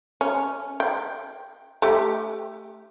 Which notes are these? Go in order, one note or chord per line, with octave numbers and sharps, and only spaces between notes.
C#4
G5
A3 G4